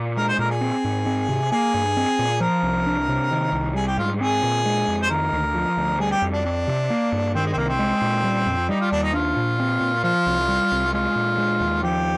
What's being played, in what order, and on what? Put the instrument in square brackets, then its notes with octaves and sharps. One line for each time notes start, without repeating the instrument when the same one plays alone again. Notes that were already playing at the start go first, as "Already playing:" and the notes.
Already playing: [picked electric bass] A#2
[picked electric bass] G#3 [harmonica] A#4
[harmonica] C5
[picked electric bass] A#2 [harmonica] A#4
[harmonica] G#4
[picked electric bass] C4
G#2
C4
C3
[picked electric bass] A#3 [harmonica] G#4
[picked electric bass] G2
C4
A#2
[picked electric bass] F3 [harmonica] A#4
[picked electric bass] C2
D4
C3
D#3
C2
[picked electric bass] G3 [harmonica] G#4
[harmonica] G4
[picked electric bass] G#2 [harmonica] F4
[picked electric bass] C4 [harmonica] G#4
[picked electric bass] A#2
G#3
F2
[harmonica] C5
[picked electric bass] D#3 [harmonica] A#4
[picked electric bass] D2
F3
D2
[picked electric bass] G3 [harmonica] G#4
[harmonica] G4
[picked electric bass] F2
[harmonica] D4
[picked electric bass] C4 [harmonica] D4
[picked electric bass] C3
A#3
G2
[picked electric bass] D#3 [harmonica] C4
[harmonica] G#3
C4
[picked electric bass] C2 [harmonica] A#3
[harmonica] C4
[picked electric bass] G#3
A#2
G3
F2
[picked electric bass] G3 [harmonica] D#4
[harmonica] F4
[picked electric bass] D#2 [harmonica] D4
[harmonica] D#4
[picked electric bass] D4 [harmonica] F4
[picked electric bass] A#2
C4
A#2
[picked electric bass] F3 [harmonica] F4
[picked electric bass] C2
G3
C2
[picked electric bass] G#3 [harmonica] F4
[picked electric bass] A#2
G#3
D#2
[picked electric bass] F3 [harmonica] G4